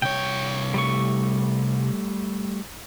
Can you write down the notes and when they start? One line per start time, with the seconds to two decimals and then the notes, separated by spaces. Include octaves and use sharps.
0.02 C2 C#5 G5
0.74 G3 A3 C#6